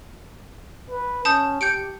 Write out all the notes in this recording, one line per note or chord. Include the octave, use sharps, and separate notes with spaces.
B4
C#4 A5 D#6 G6
G4 G6 C#7 D7